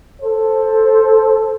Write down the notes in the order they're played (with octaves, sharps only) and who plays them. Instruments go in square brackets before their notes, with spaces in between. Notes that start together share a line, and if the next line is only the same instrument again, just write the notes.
[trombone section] A4 C5